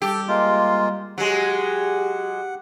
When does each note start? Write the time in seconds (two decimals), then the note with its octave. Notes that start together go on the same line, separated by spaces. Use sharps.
0.02 G3 G4 A4
0.28 G#3 A#3 F4
1.18 F#3 G#3 G4 F#5